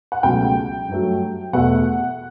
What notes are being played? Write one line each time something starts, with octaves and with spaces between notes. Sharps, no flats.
F#5
C#2 B2 F#3 A3 G5
G2 F#3 A3
E2 B2 A3 F#5